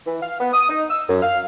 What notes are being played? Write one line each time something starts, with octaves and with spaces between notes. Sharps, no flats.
E3
F5
B3
D#6
D#4
E6
F#2
F5